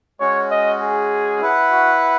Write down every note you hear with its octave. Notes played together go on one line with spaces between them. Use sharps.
G#3 C#4 F#4 C#5
D#5
G#4
E4 B4 F#5
F#4